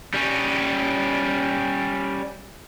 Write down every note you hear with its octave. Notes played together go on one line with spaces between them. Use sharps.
G3 C#4